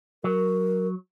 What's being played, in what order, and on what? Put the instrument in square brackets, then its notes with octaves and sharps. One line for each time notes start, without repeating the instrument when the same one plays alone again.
[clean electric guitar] F#3 [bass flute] A#4